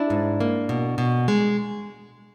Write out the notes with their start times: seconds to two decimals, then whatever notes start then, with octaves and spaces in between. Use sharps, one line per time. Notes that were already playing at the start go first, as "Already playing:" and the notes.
Already playing: D4 E4
0.10 G#2
0.40 A#3
0.69 B2
0.98 B2
1.28 G#3